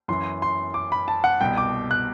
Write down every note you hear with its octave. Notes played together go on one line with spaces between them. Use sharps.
F#2 E3 C6
C6
D6
B5
A5
F#5
C2 B2 G5
D6
F#6